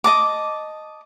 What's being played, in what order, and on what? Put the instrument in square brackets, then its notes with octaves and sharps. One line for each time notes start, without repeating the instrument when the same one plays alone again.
[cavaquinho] D#5 A5 D6